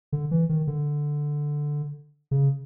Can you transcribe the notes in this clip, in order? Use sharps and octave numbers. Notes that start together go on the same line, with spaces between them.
D3
E3
D#3
D3
C#3